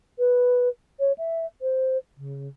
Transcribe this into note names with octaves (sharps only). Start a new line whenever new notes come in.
B4
C#5
E5
C5
C#3